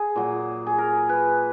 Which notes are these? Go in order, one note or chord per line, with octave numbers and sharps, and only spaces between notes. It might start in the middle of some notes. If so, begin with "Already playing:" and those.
Already playing: G#4
A#2 F#3
G#4
A#4
B4